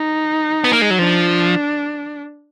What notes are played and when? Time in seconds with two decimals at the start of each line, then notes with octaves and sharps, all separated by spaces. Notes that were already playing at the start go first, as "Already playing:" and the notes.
Already playing: D#4
0.64 B3
0.73 A#3
0.82 G#3
0.90 F#3
0.99 F3 D4